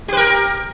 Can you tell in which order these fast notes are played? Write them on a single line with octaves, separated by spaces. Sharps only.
G4 B4 A#4